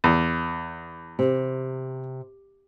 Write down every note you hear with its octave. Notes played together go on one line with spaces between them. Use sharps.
E2
C3